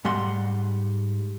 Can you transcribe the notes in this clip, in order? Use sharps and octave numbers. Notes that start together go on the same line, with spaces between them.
G#2 G3 F#5 C6